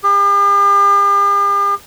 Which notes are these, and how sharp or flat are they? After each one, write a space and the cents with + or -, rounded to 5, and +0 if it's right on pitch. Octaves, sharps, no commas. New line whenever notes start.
G4 +45